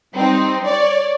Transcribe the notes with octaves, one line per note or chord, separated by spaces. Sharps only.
G3 C4 D#4
C#5 D5